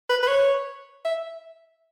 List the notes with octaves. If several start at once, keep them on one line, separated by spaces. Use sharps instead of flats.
B4
B4
C#5
E5